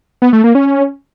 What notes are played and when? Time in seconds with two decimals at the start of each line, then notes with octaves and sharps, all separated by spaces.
0.22 B3
0.33 A3
0.44 A#3
0.55 C#4
0.66 C#4